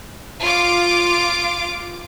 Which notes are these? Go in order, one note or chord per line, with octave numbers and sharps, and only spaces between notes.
F4 D6